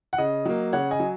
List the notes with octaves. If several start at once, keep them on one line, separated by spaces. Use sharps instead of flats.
F#5
C#3 D#5
F#3 A#3
C#3 C#5 F#5
D#5 G#5
F#3